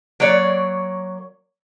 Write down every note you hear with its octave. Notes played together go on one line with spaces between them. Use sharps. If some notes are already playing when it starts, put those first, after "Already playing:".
F#3 A#3 C#5 D5